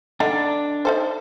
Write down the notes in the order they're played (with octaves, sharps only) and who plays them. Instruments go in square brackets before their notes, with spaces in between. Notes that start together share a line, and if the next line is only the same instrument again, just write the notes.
[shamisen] D3 D#4 [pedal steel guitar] D4
[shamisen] D#4 A4 C5